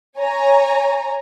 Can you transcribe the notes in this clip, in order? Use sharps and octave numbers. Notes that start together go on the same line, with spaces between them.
C#5 G#5 A#5